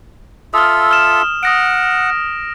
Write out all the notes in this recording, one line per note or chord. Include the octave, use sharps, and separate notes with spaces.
F4 A4 E5 D#6 F6
F6 E7
F#5 D#6 A#6 D7